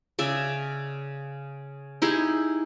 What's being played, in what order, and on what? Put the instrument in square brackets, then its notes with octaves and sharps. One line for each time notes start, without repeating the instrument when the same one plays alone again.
[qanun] C#3 D5 E5
D#4 E4 G4 G#4